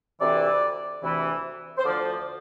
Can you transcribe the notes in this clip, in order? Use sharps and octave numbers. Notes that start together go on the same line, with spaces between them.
D2 C3 E3 D5
D2 C3 E3
C5
D2 D3 F3 D5